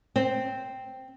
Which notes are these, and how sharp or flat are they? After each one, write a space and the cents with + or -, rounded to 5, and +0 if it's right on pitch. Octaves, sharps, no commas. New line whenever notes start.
C4 -5